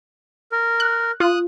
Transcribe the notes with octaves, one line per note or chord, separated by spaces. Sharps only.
A#4
F#6
F4 D#6 F#6